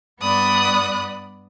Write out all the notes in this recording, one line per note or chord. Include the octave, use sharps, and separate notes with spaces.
G2 B3 D5 B5 D#6 F#6